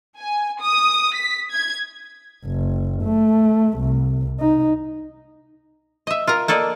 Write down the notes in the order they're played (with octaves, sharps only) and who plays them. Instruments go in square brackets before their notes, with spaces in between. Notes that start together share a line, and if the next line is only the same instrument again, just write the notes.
[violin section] G#5
D#6
B6
G#6
[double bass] F#1
A3
C2
D#4
[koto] D#5 E5
F4 A#4 A#5
A#3 A4 D5 D#5